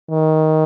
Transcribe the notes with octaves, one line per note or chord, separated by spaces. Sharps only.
D#3